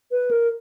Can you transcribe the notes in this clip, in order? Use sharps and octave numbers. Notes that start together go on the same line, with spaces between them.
B4
A#4